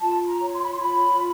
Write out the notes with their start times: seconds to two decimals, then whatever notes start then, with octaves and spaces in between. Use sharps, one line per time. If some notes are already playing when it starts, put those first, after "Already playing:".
0.01 F4 A5
0.27 A#5
0.40 C#5
0.54 C6
0.63 B5
0.72 C6
0.80 F4 B5